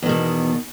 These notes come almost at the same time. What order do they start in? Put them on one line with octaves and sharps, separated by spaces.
E2 D#3 B2